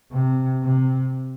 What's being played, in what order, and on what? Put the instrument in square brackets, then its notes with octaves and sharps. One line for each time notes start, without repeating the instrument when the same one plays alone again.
[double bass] C3
C3